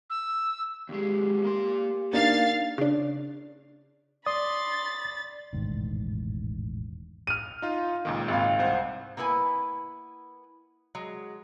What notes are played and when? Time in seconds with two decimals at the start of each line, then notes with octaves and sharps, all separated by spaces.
0.10 E6
0.89 D#2 G#3 G4
1.43 A#3 C6
2.13 A#3 D4 D#4 F5 A6
2.78 C#3 D4
4.26 D5 B5 C6 D#6 A6
5.53 E1 A1 G#2 D#3
7.27 F6 D#7
7.62 D#4 F4
8.05 C#2 A#2 D#3
8.28 G#1 F5
8.59 C2 C5 F#5
9.17 A#3 B3 E4 B4 G#5
10.95 F#3 G#3